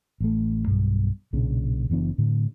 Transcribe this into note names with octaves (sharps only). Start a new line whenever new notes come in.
A1 A3
B1 G2
B1 A#2 C#3 D4
F#1 E3 B3 D4
A2 D3